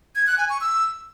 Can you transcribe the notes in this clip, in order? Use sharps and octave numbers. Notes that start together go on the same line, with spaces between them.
G#6
F#6
G#5
C#6
E6